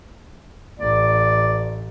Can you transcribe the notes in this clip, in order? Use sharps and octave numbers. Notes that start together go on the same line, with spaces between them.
A1 D5